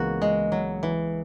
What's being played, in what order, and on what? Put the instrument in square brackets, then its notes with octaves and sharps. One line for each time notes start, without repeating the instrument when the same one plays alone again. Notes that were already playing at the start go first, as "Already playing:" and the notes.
Already playing: [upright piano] C#2 C#3 E3 B3 [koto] A#3 F#4
[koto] G#3
F#3
E3